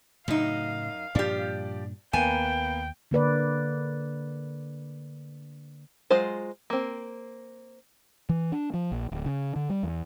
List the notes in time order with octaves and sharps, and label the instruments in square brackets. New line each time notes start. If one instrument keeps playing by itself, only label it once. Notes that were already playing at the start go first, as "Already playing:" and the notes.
[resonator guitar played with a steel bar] F#2 D#4 [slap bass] A2 C#3 F#3 [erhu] F5
[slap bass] G2 A#2 D4 [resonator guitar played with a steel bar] F3 G4 [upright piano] D5
[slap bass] D#2 [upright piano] A#3 B3 E7 [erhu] G5 [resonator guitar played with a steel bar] G#5
[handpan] D3 A#3 B4 D5
[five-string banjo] F#3 G#3 F4 C5
A#3 C4
[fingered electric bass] E3
D4
F3
A#1
D1
C#3
D3
G3
E2